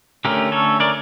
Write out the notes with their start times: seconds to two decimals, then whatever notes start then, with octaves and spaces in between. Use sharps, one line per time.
0.25 D3 A3 C#4 G4 A#4
0.52 A4 C#5
0.80 A#4 D5